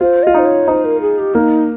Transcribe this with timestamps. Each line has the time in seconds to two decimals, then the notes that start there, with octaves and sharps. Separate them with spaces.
0.01 F4 C5
0.23 F4 D#5
0.34 D#4 C5
0.45 C#5
0.68 D#4 C5
0.85 A#4
1.01 G#4
1.19 G4
1.35 A#3 D#4